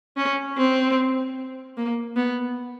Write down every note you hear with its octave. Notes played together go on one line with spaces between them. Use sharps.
C#4
C4
A#3
B3